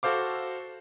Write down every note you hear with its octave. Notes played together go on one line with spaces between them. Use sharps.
F#4 A4 C5 F5 D6